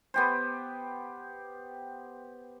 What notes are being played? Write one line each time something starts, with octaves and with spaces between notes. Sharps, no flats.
B3 G4 C5